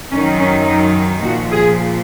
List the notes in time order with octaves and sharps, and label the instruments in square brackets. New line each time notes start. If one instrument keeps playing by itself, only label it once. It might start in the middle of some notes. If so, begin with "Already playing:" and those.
[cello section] F#2 D#3 F#3 C#4
C#4
D#4
A#2 F#4
F3
G#4